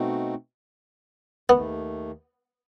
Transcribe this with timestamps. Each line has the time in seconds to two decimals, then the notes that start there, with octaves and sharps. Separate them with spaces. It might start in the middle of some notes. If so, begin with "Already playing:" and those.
Already playing: B2 A3 C4 D#4 F#4
1.49 D#2 D#3 A3 B3